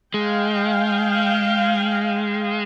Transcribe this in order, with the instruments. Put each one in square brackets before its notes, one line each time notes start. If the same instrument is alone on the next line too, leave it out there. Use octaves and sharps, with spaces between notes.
[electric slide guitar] G#3 [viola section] F5 G5